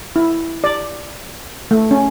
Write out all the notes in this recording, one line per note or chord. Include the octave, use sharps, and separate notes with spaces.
E4
D5
A3
C#4